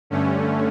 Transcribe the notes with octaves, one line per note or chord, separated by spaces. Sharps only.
G2 D3 A3 C#4